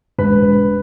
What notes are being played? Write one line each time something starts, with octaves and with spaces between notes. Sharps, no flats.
E1 B4